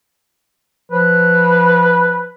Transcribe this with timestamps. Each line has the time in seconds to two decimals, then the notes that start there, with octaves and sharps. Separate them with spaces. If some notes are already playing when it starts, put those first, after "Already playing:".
0.92 F3 B4